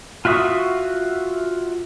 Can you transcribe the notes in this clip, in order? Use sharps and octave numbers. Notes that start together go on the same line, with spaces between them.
F4 F#4 E5 C#6 D#6